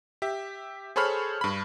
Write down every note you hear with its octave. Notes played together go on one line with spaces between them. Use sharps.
G4 E5
G#4 A4 C5 C#5 B5 F6
G2 B5